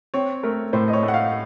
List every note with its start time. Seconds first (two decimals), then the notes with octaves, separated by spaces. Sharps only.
0.14 C4 C#5
0.43 A3 A#4
0.73 A2 C5
0.88 D#5
0.93 C#5
1.03 A3
1.08 F#5
1.14 F5